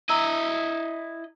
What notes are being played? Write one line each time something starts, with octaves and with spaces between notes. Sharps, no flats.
E4 D#5 A#5 E6